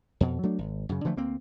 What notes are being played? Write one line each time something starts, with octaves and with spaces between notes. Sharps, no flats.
F2 B2
F#3 A3 D4
G#1
F#2 C#3
D3 E3 F3 A3
D2 A#3 C4